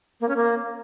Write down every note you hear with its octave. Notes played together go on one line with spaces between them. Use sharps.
A#3
C#4
A#3